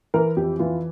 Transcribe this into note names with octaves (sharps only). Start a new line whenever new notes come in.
E3 A#4
F2 G4
E3 F4